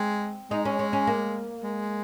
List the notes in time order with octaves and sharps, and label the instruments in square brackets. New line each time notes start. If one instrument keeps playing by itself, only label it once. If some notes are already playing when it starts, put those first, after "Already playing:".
Already playing: [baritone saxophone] G#3 [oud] C4
[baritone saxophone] G#3 [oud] D#4
[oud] C#4
C#4
C#4
A#3
[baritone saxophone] G#3